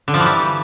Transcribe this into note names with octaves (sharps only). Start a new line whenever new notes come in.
D3
F3
E3
G3